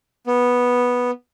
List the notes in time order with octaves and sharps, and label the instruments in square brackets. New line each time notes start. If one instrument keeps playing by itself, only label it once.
[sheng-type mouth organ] B3